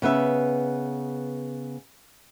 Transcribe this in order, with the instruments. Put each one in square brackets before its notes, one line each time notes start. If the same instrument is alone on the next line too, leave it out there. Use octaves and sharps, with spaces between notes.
[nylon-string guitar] C#3 B3 B4 E5